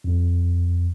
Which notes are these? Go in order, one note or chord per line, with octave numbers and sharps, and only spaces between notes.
F2